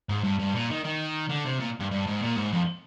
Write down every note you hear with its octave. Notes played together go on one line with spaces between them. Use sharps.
G#2
G2
G2
A#2
D#3
D#3
D3
C3
A#2
G2
G2
G#2
A#2
G#2
F2